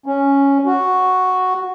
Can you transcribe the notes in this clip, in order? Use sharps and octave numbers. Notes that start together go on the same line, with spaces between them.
C#4
F#4